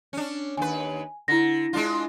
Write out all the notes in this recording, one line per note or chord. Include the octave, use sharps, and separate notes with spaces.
C#4 D4
D#2 B4 G#5
D3 E4 A#6
G#3 D4 F4